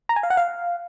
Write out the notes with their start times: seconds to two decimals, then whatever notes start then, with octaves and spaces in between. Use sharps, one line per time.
0.09 A#5
0.16 G#5
0.23 F5
0.30 F#5
0.37 F5